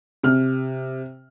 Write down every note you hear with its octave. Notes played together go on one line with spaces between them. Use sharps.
C3 F6